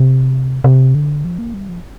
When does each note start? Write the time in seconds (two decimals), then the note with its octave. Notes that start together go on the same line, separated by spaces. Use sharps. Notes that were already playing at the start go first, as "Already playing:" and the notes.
Already playing: C3
0.64 C3
0.95 D3
1.25 F3
1.39 A#3
1.54 G3
1.69 F3